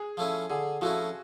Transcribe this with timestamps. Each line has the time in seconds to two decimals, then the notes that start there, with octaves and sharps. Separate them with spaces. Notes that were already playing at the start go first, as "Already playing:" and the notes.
Already playing: G#4
0.17 F3 A3 C#4 E4
0.50 D3 G#4
0.81 F3 A3 C#4 E4 F#4